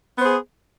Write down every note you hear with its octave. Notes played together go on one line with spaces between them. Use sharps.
B3 G#4 C5